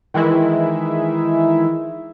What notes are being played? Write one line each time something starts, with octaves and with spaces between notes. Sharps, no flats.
D#3 E3 G#3 E4